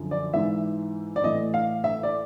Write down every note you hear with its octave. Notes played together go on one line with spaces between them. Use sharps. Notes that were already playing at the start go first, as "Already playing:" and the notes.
Already playing: F#2 D3 F3
D5
G#2 E3 E5
D5
A2 E3 D#5
F5
E5
D5